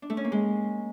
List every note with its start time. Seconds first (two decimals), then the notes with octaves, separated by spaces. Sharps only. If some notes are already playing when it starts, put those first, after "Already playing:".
0.02 D4
0.10 A3
0.17 C#4
0.24 A#3
0.32 G#3